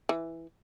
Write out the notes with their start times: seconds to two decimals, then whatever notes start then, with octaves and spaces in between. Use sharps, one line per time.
0.09 E3